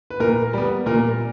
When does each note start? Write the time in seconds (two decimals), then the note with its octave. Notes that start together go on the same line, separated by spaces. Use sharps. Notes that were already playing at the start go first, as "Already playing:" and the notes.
0.10 B4
0.20 A#2 A#4
0.53 G3 B3
0.86 A#2 A#4